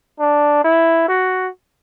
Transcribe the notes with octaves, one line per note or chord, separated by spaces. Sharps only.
D4
E4
F#4